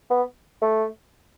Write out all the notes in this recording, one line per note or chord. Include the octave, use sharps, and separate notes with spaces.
B3
A3